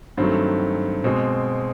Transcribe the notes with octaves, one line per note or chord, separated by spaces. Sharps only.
G2 D#3 F#3 A3 C4
B2 G#3 C4